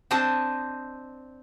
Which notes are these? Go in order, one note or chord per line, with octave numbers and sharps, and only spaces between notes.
C4 D4 C5 D#5 A5